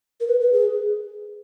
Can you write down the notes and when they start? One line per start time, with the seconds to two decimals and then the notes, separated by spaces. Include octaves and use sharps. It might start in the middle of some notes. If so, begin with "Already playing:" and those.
0.20 A#4
0.28 B4
0.41 B4
0.53 G#4